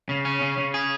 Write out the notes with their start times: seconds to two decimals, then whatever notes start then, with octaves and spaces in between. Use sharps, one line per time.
0.09 C#3
0.25 C#4
0.42 C#3
0.58 C#3
0.74 G#4